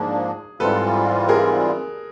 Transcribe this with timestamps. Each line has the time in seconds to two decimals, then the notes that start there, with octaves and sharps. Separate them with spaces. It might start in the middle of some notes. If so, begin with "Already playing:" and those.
Already playing: G#2 F3 A#3 D4 G#4
0.59 G#2 E3 G3 C4 F4 A4 B4
1.29 G#4 A#4